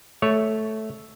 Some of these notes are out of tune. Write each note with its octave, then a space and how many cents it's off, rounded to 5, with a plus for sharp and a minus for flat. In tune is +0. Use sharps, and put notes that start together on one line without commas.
A3 -10 C#5 +0